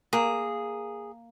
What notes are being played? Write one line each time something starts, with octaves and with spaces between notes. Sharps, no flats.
A#3 G#4